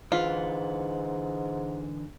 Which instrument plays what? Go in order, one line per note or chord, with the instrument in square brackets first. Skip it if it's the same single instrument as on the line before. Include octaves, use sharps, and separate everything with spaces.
[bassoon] G#2 [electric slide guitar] D3 E3 B4 [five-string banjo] F4